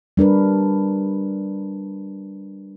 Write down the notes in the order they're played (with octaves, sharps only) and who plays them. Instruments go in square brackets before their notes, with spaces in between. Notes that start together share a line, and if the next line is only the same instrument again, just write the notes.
[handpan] G3 D4 A#4 B4